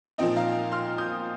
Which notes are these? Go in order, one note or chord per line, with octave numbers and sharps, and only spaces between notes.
A#2 F3 C4 D#4 D#5 G5
F5 A#5
C6 F6
D#6 G6